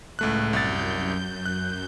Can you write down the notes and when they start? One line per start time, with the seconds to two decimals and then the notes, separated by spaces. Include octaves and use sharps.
0.19 C#2 A2 A3 F#6
0.53 C2 F#2 G6 A6
1.46 F#6